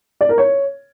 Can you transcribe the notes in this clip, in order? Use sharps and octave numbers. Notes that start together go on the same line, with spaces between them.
D5
A#4
C#5